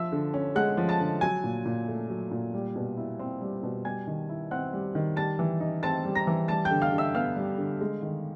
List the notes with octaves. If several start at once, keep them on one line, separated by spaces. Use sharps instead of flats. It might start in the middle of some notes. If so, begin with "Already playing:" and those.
Already playing: F3 E5 E6
D3
C#4
G#3 F#5 F#6
F3
A5 A6
D3
F#3 G#5 G#6
A#2
A#2
A3
F#3
A#2
G3
B2
E4
C4
G3
B2
G3 G#5 G#6
D#3
E4
C4 F#5 F#6
G3
D#3
G3 A5 A6
E3
D#4
C4 A5 A6
G3
A#5 A#6
E3
G3 A5 A6
G5 G6
D3
F5 F6
D3
E5 E6
B3 F5 F6
G3
D3
G#3
D#3